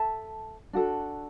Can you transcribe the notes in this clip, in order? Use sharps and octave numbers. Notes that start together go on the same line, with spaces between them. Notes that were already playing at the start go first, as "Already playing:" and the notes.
Already playing: A4 E5 A5
D4 F#4 A4